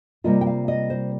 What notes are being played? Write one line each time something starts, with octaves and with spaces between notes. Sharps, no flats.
C3 G3 A#3 F4 D#5
G5
F5
D#5
C5